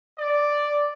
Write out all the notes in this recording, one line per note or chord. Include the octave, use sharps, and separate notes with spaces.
D5